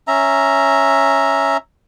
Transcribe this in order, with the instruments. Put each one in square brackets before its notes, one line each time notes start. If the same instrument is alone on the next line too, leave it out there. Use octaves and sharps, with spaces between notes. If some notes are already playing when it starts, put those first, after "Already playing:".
[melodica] C#4 E5 A#5